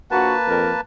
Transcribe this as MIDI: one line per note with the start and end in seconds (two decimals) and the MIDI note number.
0.11 0.34 34
0.11 0.81 58
0.11 0.34 66
0.11 0.81 71
0.11 0.81 81
0.48 0.71 41
0.48 0.71 70